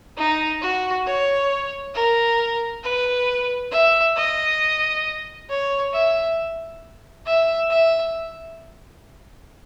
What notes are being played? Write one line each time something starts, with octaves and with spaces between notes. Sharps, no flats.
D#4
F#4
C#5
A#4
B4
E5
D#5
C#5
E5
E5
E5